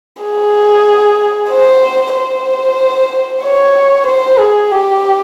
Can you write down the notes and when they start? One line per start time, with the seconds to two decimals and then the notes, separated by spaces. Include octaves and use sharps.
0.22 G#4
1.50 C5
2.15 C5
3.42 C#5
4.06 C5
4.39 G#4
4.71 G4